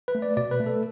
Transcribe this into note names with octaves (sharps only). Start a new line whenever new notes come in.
B4
A3
D5
B2 D5
B4
A3
A4